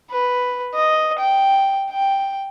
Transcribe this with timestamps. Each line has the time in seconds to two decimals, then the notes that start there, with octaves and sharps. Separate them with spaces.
0.11 B4
0.74 D#5
1.19 G5
1.91 G5